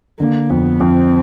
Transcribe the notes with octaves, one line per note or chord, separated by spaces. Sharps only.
D3 A#3
F2 B3
F2 C4